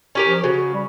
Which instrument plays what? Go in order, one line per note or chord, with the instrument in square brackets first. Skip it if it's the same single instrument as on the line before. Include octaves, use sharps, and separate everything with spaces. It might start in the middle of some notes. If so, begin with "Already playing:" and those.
[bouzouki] C#4 G4 A#4
[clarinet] F3
[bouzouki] C#3 [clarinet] F#4
[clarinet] G3